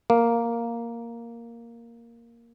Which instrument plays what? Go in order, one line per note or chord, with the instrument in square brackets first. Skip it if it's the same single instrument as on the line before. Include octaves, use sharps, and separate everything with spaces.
[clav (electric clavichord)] A#3